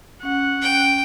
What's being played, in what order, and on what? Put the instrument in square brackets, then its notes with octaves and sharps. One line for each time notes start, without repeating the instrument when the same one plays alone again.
[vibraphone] C#4 [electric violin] F#5
[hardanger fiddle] G5